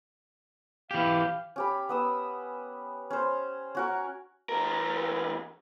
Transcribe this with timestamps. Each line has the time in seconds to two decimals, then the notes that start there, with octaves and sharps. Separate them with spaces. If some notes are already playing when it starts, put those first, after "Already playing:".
0.91 E3 G4 F5
1.56 C#4 G4 B5
1.89 B3 D#6 E6
3.10 C#4 C5
3.75 C#4 F#4 A#4
4.49 E2 A#4